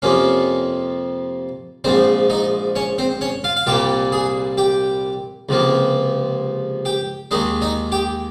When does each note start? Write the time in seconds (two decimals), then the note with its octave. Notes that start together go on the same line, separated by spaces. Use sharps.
0.02 F2 C3 F3 A#3 C#4
1.84 A#1 G#2 F3 C4 C5
2.30 D#4 D#5
2.76 C#4 C#5
2.98 C4 C5
3.21 C#4 C#5
3.44 F4 F5
3.56 F5
3.67 C2 A#2 G3 A#3 G4 G5
4.12 G#4 G#5
4.57 G4 G5
5.49 C#2 C3 F3 A#3
6.85 G4 G5
7.31 D#2 D#3 G#3 D#4 D#5
7.62 D#4 D#5
7.92 G4 G5